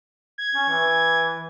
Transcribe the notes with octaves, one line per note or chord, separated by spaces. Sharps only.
G#6
C#4
E3